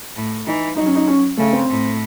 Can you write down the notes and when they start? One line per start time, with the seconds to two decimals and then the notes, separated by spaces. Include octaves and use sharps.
0.16 A2
0.46 E3 D#4
0.76 F#3 D#4
0.86 C#4
0.95 D#4
1.07 C#4
1.37 C#3 A3
1.53 C4
1.69 A2